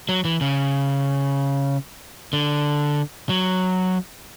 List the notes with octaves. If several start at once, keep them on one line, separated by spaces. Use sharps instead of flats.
F#3
E3
C#3
D3
F#3